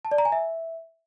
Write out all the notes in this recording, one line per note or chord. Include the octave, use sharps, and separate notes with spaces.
A5
D5
A#5
G#5
E5